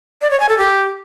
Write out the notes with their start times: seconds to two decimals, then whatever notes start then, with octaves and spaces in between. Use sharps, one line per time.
0.22 D5
0.31 C#5
0.40 G#5
0.49 A4
0.58 G4